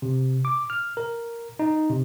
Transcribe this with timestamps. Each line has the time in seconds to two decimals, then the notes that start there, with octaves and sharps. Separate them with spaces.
0.02 C3
0.45 D6
0.70 F6
0.97 A#4
1.59 D#4
1.90 C3